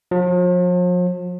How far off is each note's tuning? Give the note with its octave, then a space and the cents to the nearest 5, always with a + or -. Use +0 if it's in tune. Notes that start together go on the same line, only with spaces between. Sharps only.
F3 +45